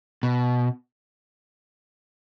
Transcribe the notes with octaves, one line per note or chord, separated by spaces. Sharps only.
B2